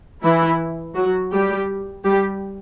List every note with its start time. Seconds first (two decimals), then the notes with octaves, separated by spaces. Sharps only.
0.22 E3 E4
0.95 F#3 F#4
1.31 G3 G4
2.04 G3 G4